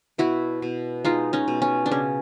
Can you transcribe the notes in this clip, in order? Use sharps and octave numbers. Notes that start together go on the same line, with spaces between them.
B2 E4 F#4
B2
G#3 D#4 F4
C#4 D#4
B2
C#4
D4
C#3 C#4